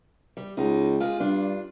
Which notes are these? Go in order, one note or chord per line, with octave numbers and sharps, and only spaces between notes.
G3
C#2 D#4
G#3 F4 G4
G2 D4 F4